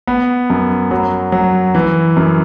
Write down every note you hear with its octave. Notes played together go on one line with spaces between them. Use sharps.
B3
F#2
F#3
F#3
E3
F#2